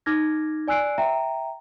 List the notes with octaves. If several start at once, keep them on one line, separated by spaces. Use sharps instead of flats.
D#4 D6 F6 G#6 A#6
D5 G#5 E6 F#6 C7 D7
E5 G5 A#5